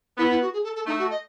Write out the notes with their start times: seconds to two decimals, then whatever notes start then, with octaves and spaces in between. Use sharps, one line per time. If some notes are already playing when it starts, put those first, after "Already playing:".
0.18 B3 E4
0.30 E4
0.41 F#4
0.53 G#4
0.64 A4
0.75 A4
0.87 A3 D#4
0.98 F#4
1.10 D#5